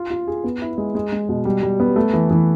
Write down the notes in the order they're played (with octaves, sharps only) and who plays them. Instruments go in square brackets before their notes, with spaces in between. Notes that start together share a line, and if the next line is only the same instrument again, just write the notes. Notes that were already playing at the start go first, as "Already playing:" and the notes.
Already playing: [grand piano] F4
F4
G#4
B3
E4
G#3
G#3
G#3
B2
G3
G3
B3
A3
E3
E3